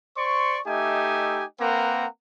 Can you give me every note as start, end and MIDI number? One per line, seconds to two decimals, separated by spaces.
0.17 0.59 72
0.17 0.59 74
0.17 0.59 84
0.17 0.59 85
0.66 1.43 57
0.66 1.43 63
0.66 1.43 67
0.66 1.43 75
0.66 1.43 76
0.66 1.43 80
1.60 2.06 58
1.60 2.06 60
1.60 2.06 70
1.60 2.06 71
1.60 2.06 78
1.60 2.06 82